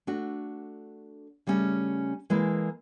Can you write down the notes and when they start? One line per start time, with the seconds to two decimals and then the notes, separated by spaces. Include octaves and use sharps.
0.07 A3 D4 F#4
1.47 C#3 G3 A3 C#4
2.30 E3 G#3 A#3 E4 A4 D#5